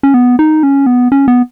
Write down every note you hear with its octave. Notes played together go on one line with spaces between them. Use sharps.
C#4
B3
D#4
C#4
B3
C#4
B3